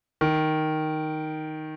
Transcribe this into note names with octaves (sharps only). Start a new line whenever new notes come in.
D#3